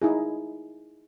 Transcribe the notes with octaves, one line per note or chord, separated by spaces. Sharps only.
D#4 E4 G#4